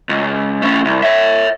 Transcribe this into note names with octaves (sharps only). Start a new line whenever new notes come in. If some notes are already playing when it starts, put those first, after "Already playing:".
C#2
A3 C#4
C2
C#5 E5